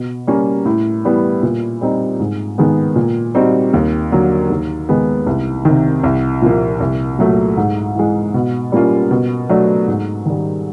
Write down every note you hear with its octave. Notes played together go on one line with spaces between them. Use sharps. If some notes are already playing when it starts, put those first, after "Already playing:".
Already playing: B2
G3 A#3 C#4
A2
E3 G3 B3
A#2
G3 C4 D#4
G#2
D#3 G#3 B3
A#2
G3 C4 D#4 F#4
D#2
D3 F#3 A#3
D#2
D#3 G#3 B3
C2
C3 D#3
C2
A#2 F3 A#3
C2
A#2 F#3 A3
G#2
E3 G#3
B2
G3 A#3 C#4 F4
B2
F#3 A3 D4
G#2
D#3 G3